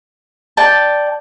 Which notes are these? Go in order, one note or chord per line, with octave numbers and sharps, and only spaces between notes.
D5 G5 A5